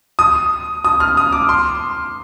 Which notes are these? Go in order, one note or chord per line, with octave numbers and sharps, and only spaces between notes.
D#6
D#6
F6
D#6
D6
C6